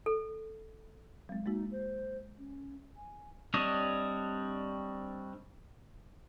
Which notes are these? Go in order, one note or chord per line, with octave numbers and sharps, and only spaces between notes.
A4
F#3 G#3 C4
G#3 A#3 D#4 F#4
C5
C#4
G#5
G3 C4 D4 C#5 D#5